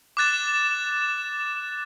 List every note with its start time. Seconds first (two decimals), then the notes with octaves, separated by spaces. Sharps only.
0.17 D6 F#6 A6 E7